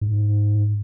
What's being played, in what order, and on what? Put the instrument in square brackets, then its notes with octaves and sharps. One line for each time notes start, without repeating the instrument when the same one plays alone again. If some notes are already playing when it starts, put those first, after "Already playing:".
[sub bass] G#2